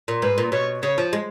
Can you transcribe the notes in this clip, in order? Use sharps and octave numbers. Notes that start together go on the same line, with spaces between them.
A#2
G#2 B4
A#2
B2 C#5
C#3 C#5
F3
G#3